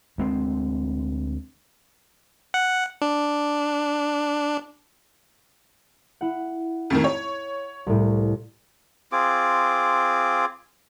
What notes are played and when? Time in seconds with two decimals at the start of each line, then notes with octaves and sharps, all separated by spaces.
0.18 D2 G#3 C4
2.54 F#5
3.02 D4
6.21 E4 F#5
6.90 F2 A2 D#3
7.04 C#5
7.87 C2 A2
9.12 C4 F4 G#4 D6